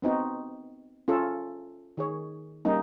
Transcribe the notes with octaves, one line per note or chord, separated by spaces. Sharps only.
B3 C4 D#4 F#4
C#4 F4 A4
D#3 G#4 C#5
G3 A#3 C#4 D#4